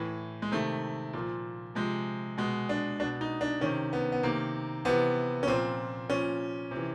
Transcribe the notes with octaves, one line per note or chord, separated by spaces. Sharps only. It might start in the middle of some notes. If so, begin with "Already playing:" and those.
Already playing: A2 E3
G#3
C3 D#3 A3
A#2 F3
C3 F3 G#3
B2 G#3
D4
B2 D4
D#4
D4
C3 D#3 C#4
B3
B3
C3 D#3 A#3
C3 E3 B3
C#4
A#2 F3 C4
A#2 F3 C#4
C3
E3